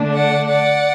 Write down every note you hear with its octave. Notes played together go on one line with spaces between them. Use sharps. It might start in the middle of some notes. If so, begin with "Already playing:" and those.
Already playing: D3 A3 D4
D5 F#5
D5 F#5